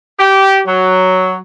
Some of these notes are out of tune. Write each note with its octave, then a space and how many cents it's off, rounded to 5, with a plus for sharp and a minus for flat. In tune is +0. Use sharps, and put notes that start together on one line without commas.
G4 -15
F#3 +5